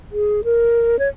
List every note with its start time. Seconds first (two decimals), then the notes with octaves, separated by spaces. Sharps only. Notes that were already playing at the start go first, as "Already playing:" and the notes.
0.12 G#4
0.44 A#4
0.99 C#5